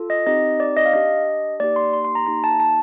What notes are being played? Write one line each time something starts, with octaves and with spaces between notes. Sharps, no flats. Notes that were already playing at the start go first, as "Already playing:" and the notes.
Already playing: F4 A4
D#5
C4 D#4 G4 D#5
D5
D#5
F5
D4 G4 D#5
A#3 D#4 G4 D5
C6
C6
C6
A#5
A#3 D#4 G4 A#5
A5
A5